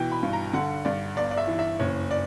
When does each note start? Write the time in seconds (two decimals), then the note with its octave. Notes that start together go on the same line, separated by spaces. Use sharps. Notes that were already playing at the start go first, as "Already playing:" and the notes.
Already playing: B2 E3 G5
0.12 B5
0.23 G2
0.33 A#5
0.53 D3 F#5
0.85 G2 D5
1.16 G1 D5
1.31 D5
1.38 E5
1.47 E3
1.59 E5
1.79 F#1 C#5
2.11 D5